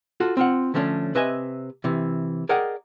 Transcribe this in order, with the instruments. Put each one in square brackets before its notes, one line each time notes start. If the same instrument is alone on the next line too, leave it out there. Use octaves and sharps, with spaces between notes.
[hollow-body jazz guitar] F4 F#4 A4
C4 F4 F#5
D3 F3 A3 C#4 D4
C3 B4 D#5 E5 G#5
C3 E3
G#4 A#4 D5 D#5 F#5 G5